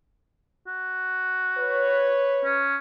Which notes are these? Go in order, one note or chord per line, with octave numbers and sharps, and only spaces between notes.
F#4
B4 C#5
C#4